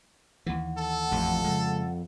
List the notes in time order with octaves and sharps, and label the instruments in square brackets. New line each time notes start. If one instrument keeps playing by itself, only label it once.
[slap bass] D#2 E3 [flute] F#5
[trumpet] A4
[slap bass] A1 C3 [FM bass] F2
[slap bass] C#3 G#3